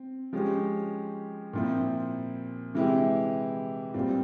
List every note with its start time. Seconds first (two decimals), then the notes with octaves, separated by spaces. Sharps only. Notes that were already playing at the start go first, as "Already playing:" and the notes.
Already playing: C4
0.33 F3 G#3 C#4 G4
1.53 A#2 F3 C4 E4
2.74 C3 E3 G#3 E4 G4
3.94 A#2 G3 C4 F4